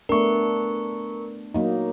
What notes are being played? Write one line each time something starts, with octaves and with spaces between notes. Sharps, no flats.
A3 B3 D4 A#4 C#6
F#3 A#3 D#4